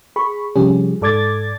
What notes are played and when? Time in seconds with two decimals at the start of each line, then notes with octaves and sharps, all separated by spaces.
0.16 G#4 B5 C#6
0.56 C3 F3 G3 C#4 G4 G#4
1.01 G#2 A4 D5 D6 G#6 A6